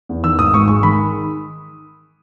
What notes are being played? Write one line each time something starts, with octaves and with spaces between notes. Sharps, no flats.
E2
D#3 E6
G#1 D#6
G#2 C#6
G#3 C#6
D#3 B5